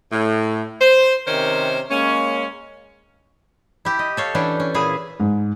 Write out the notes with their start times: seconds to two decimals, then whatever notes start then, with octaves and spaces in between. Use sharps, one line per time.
0.12 A2
0.81 C5
1.27 C3 D#3 C#4 A#4 C5
1.91 G#3 A#3 C#4
3.85 E4 G4
3.99 D#5
4.17 A4 C#5 F5
4.35 E3 C#4 D4 E5 G5
4.60 C#4
4.74 A#2 E3 E4 G#4
5.20 G#2